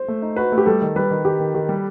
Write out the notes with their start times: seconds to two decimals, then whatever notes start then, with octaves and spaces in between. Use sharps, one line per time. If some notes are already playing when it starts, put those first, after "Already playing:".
Already playing: C5
0.08 A3
0.22 D#4
0.36 F#4 B4
0.52 A3
0.58 G4
0.66 G3 A4
0.82 D#3
0.96 G3 B4
1.11 D#3
1.25 D#3 G4
1.40 D#3
1.54 D#3 G4
1.69 G3